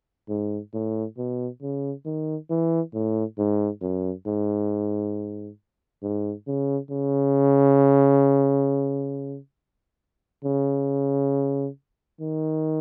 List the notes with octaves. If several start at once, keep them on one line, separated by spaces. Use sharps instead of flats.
G#2
A2
B2
C#3
D#3
E3
A2
G#2
F#2
G#2
G#2
C#3
C#3
C#3
D#3